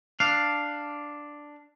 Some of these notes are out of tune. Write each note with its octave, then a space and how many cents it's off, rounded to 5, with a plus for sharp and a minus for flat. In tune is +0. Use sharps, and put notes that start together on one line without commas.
D4 +0 F5 +0